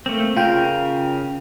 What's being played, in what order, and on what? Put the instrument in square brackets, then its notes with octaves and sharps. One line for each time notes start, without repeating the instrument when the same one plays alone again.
[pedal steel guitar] A3 A#3 C4
[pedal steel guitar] C#3 A#4 [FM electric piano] F4 G5